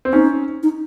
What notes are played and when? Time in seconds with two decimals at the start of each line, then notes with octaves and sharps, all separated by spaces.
0.05 C4
0.13 C#4 D#4
0.63 D#4